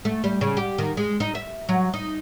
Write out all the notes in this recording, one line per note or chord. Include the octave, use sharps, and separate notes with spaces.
A3
G3
C#3
G4
D#3
G#3
D#4
E5
F#3
D#4